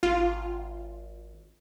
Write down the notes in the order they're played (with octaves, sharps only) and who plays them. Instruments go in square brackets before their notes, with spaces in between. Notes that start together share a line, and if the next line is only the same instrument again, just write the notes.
[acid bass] G#1 [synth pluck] F4